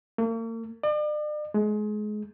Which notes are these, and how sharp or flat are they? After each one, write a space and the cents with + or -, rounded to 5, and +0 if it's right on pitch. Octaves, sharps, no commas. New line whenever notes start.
A#3 -40
D5 +40
G#3 +25